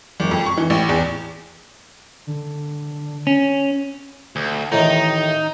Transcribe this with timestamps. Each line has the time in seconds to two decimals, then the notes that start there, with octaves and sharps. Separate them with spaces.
0.20 F#1
0.31 F2
0.46 C#6
0.57 E3
0.70 A1
0.89 E2
2.27 D3
3.27 C#4
4.36 D2
4.72 A1 A2 D#3 D#4 A#5